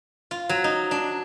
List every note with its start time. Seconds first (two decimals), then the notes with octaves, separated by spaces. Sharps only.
0.31 F4
0.49 F#3
0.64 D#4
0.91 D4